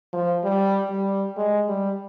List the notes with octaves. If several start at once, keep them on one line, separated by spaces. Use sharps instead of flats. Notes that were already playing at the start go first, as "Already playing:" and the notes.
F3
G3
G3
G#3
G3